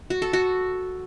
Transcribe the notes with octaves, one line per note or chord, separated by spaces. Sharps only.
F#4
A4
F#4